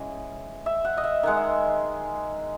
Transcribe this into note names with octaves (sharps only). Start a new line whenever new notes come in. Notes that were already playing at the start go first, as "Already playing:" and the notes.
Already playing: C#3 E3 G#3
E5
F#5
D#5
E5
D#3 G#3 F#5
E5